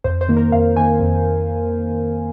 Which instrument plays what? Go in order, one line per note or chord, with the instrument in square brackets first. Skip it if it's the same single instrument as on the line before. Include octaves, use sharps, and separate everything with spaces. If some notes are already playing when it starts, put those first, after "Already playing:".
[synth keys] F2 C5
C5
D#3 A#3
A#4
F2 F5
D#3 A#3 G#5
F2